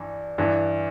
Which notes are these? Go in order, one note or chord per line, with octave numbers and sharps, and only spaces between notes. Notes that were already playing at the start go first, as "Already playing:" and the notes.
Already playing: G2 E3
G2 E3